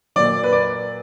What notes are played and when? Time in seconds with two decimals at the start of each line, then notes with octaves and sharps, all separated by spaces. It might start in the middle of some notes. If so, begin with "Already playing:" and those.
0.16 A#2 F#3 D5
0.43 B4
0.52 D5